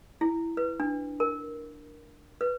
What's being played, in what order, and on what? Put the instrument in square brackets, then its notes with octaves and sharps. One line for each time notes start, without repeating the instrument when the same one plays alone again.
[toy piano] E4
B4
D4
A#4
B4